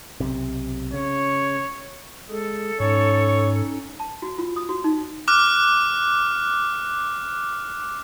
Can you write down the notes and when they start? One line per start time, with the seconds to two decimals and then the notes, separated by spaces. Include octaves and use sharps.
0.20 B1 C3
0.94 C#3 C#5
2.29 G#3 G#4 A4
2.80 G#2 C#4 D#4 C#5
4.00 A5
4.22 F#4
4.38 F4
4.56 D#6
4.69 F#4
4.84 D#4
5.28 D6 F6 F#6